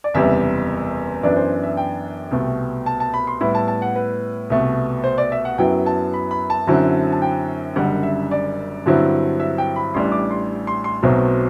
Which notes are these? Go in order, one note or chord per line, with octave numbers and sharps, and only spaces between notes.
D5
F#1 E2 C3 G3 B3 E5
F#2 E3 B3 D4 D5
C5
E5
G5
C2 B2 A3
A5
A5
B5
C6
A2 G3 B3 E4 B5
A5
A5
F#5
B4
C2 B2 A3
C5
D5
E5
F#5
F#2 F#3 B3 E4 G5
A5
B5
B5
A5
F#2 D3 F#3 C4 E4
A5
G5
F#1 F#2 D3 G3 F#5
E5
D5
G2 D3 F#3 C4 E4
E5
G5
B5
A1 A2 G3 D4 C6
D6
C6
C6
C6
B1 B2 F#3 A3 C4